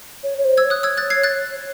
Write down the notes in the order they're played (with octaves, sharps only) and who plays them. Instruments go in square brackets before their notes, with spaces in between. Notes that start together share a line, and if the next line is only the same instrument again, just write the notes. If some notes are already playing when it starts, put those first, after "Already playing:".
[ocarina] C#5
C#5
C5
[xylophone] E6 G#6
[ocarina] C#5
[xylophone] D#6 F#6
E6 G#6
F#6 A6
G#6 C7
F#6 A6